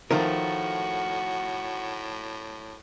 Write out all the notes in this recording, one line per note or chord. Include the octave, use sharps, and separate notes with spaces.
A2 D#3 F3 A3 F#4 A#4